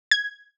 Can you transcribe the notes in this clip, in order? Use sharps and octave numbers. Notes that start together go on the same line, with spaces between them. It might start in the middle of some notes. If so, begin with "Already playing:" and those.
G#6